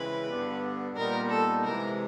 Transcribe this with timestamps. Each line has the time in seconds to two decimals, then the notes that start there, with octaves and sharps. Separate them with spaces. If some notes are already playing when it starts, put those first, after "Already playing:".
Already playing: C#3 E3 G#3 C4 E4 B4
0.29 G2 D3 G3 B3 D4
0.96 A#2 G3 B3 D#4 A#4
1.30 A4
1.64 C3 E3 G#3 A#4